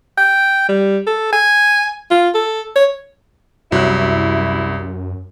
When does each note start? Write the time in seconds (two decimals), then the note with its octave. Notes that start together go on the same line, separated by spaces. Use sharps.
0.18 G5
0.69 G3
1.07 A4
1.33 G#5
2.10 F4
2.34 A4
2.75 C#5
3.72 C2 F#2 F#3 E4 C#5 F#6